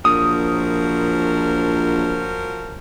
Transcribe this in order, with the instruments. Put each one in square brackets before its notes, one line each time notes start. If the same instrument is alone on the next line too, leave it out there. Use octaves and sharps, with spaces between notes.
[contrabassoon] A#1 [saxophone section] F3 F#3 A#4 [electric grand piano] D#6